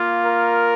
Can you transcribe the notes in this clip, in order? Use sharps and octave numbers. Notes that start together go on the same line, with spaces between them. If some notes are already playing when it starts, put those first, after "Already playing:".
Already playing: A#3 F4
A#4